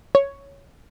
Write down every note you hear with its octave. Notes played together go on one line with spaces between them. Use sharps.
C#5